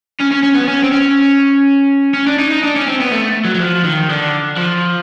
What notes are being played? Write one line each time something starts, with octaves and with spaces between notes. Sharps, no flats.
C#4
C#4
C#4
B3
C#4
C4
C#4
C#4
D4
D#4
D#4
D4
C#4
C4
B3
A3
F#3
F#3
F3
D#3
D3
F3